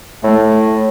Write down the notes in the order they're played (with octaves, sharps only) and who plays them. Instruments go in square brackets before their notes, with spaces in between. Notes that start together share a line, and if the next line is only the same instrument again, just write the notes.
[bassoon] A2 [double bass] A3